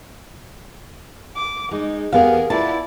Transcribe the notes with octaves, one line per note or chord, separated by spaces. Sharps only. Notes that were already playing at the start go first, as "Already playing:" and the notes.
D6
G#3 D#4
E2 B3 G4 G#4 A#4 F5
B3 E4 F4 D5 A5